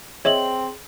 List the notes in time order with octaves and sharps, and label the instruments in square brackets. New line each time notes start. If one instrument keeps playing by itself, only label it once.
[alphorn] C4 [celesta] G#4 F#7 [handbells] C#5 D#5 E5